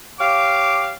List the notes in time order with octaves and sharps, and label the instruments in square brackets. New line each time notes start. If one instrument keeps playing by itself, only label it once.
[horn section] G4 C#5 F5 [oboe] D6